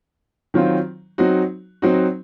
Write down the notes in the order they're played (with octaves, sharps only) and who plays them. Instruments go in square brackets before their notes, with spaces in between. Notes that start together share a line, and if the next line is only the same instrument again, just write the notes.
[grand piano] D#3 F#3 C4 F4
F#3 C4 D#4 F#4
F#3 C4 D#4 F#4